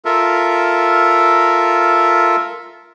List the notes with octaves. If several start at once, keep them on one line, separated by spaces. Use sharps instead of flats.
F4 A4 A#4 E5